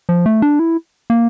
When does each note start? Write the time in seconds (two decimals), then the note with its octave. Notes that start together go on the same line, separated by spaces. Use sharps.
0.09 F3
0.26 A3
0.42 D4
0.59 E4
1.10 A#3